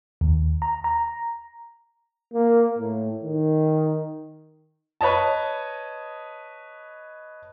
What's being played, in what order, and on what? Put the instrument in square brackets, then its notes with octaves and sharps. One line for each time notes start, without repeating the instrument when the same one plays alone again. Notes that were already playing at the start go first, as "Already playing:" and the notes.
[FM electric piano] D#2
A#5
A#5
[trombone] A#3
A2
D#3
[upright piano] B4 C#5 D#5 A5